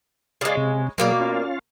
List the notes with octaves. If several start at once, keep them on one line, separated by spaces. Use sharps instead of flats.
C#3 G#3 G#4 D5 F5
C3
B2 F#3 A#3 G#4 A#4 D5
C#4 F4 F5